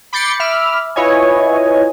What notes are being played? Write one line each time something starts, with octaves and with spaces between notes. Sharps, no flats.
B5 D6 G6 A6 C7 C#7
E5 B5 D6 E6 F6
E4 F4 B4 C#5 D#5 G#5